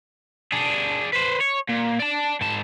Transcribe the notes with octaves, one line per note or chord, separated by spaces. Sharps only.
D4 G#4
B4 C5
C#5
A#2
D5 A5
G#2 A5